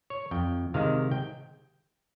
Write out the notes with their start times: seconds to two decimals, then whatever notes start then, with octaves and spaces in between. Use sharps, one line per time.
0.10 C#5
0.31 F2 G5
0.74 C3 D#3 G#3 F5
1.11 G5